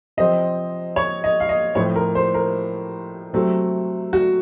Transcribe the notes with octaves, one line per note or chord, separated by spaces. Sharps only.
C3 F3 C4 D#5
C#5
D#5
F5
D#5
A2 F3 C4 C#5
A#4
C5
A#4
C3 F#3 A3 C4
F#4